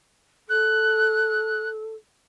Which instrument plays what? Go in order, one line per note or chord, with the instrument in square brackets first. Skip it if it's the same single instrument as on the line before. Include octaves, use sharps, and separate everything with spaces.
[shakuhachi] A4 [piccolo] F#6